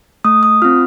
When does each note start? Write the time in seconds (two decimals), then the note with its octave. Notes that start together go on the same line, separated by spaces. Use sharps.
0.25 A3 D#6
0.43 D#6
0.62 C4 F4 F6